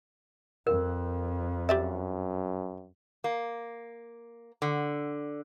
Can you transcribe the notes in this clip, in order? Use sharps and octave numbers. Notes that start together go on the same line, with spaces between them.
F2 A#4
F#2 G4 D5 E5
A#3
D3